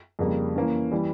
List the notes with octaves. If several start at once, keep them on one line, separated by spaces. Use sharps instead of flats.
F2 C#3 G3 A#3
E3 A#3 C#4
E3 G3